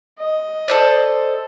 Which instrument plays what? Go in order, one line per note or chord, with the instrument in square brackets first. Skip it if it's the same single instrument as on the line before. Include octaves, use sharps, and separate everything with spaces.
[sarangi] D#5
[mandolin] A4 C5 D5